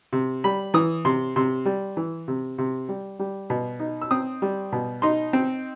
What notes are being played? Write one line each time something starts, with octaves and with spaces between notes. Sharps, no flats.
C3
G3 B5
E3 D#6
C3 C6
C3 C6
G3
E3
C3
C3
G3
G3
B2
D#4
E6
C4 D#6
G3
B2
D#4 C6
C4